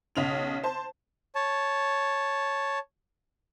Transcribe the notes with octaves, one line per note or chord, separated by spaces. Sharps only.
B1 C#3 F7
C5 A5
C#5 A5